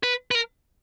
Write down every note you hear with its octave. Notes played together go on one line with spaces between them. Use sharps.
B4
B4
A#4